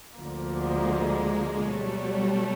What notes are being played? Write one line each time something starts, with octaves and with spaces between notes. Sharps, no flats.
D2 D3 F3 A#3
G#3
G#3
B2 F#3 G3 A3